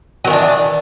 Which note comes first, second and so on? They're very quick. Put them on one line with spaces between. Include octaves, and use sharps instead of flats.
F#3 D#3 E3 D4